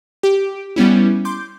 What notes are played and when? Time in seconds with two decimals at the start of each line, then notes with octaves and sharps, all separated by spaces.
0.23 G4 D7
0.76 G3 B3 C#4 E4
1.25 C6 D6 G6